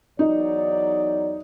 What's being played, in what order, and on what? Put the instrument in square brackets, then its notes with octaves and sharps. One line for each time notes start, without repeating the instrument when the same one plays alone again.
[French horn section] E2 F#3 D5 [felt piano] D#4